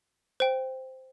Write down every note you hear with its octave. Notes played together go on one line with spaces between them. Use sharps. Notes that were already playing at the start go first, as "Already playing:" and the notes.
C5 G5